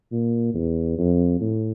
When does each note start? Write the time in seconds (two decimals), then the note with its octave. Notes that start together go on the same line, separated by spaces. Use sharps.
0.12 A#2
0.55 E2
0.99 F2
1.41 A2